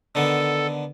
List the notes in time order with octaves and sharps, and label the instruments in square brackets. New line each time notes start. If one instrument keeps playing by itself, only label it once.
[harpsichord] D3 D#3 B3 [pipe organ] A4